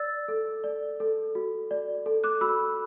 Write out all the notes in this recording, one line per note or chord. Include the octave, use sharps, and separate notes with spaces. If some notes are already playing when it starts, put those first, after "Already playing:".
Already playing: D5 E6 A6
A4
D5
A4
F#4
D5
A4
D6 F#6
F#4 B5 E6